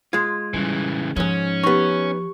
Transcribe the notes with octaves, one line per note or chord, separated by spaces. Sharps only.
G#3 F4 G#6
C#3 E3 G3
D#2 G#2 F3 C#4
B3 D#4 G4 C#6